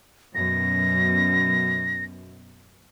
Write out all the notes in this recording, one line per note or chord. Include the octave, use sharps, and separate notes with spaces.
F#2 B2 A#6